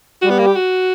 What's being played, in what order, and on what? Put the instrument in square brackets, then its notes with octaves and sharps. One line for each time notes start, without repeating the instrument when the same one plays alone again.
[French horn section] G3 [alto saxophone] F#4
[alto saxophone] B3
A#3
G4
F#4